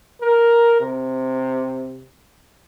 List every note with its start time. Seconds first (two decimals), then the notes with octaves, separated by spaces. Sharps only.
0.21 A#4
0.80 C3